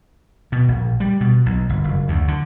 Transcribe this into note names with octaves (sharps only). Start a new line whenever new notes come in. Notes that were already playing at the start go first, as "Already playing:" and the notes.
B2
A#1
G3
B2
B1
G1
F#1
D2
D3